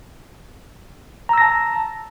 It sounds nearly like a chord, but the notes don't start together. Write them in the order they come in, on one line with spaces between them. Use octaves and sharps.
A#5 E6 A#6 A5